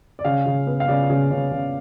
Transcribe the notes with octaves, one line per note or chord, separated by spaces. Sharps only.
D5
C#3 F5
C#3
B3
F5
C#3 D5
C#3
C#3
C#3